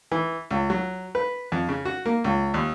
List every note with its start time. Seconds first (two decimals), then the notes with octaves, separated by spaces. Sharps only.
0.12 E3
0.51 C#2
0.70 F#3
1.15 B4
1.52 F2
1.69 C#3
1.85 F#4
2.06 A#3
2.24 C#2
2.54 D#2